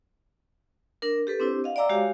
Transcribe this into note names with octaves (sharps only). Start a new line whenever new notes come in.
D4 A#4
G4 A4 B4
C4 D4 E4 G4 C5
D#5 F5 F#5
D5 E5 G5 A#5 D6 E6
G#3 F#4 G4 C#5 F5